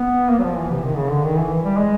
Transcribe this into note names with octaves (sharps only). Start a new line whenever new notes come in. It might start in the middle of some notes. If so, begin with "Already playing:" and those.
Already playing: B3
A#3
F#3
F3
E3
C3
D#3
C#3
D3
D#3
E3
G3
G#3